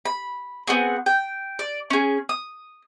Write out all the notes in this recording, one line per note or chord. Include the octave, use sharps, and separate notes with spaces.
B5
B3 C4 F#4 G#4
G5
D5
C#4 G#4
D#6